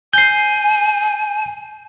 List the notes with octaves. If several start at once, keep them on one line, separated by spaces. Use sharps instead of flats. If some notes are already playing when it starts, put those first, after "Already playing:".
G#5 G6 C7